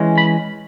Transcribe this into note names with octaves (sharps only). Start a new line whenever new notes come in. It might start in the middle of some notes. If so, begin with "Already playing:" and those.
Already playing: E3 G#3 C#4
B5